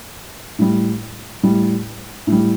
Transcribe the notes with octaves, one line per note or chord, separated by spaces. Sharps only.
A2 G3
A2 G3
A2 G3